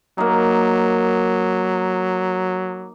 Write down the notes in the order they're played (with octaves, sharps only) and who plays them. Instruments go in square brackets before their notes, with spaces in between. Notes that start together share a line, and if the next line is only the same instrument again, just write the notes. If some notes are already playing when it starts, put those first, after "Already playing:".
[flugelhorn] F#3 [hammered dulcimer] A#3 D#4